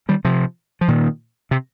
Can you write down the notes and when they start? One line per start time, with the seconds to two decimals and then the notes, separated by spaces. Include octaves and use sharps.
0.09 D#3 G3
0.25 C3 F3
0.81 F3
0.88 A#2 D#3
1.51 C3